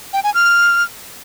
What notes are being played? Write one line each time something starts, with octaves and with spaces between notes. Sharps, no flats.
G5
G#5
F6